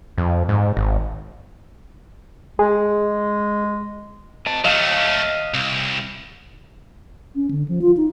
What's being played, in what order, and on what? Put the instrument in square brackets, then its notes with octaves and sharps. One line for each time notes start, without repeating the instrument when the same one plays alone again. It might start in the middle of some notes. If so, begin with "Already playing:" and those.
[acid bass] F2
G#2
G#1
[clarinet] G#3 [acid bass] G#4
[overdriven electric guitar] D#5 A5
[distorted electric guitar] F#3 A3 [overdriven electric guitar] D#5 F5
[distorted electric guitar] C2
[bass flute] C#4
D3
F3
F4
D#4